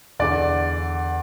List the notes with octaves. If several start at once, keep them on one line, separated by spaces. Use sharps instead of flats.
E2 D3 D5